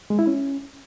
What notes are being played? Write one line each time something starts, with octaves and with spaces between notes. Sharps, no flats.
G#3
E4
C#4